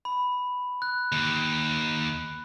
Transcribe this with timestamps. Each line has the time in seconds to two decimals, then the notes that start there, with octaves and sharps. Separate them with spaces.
0.05 B5
0.82 F#6
1.12 D#2